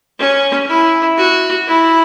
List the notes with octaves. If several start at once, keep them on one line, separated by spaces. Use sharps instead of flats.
C#4
E4
F#4
E4